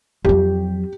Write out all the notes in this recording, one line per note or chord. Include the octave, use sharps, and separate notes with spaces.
F2 F#3 G4